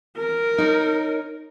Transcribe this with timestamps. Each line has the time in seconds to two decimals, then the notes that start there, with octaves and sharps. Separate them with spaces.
0.17 A#4
0.58 D#4 C#5